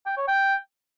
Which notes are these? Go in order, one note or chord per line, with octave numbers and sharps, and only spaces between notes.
G5
C#5
G5